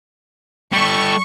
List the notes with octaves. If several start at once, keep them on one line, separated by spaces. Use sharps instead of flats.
G3 A4 C#6